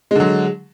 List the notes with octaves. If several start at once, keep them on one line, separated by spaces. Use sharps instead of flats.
D3 F#3 G#3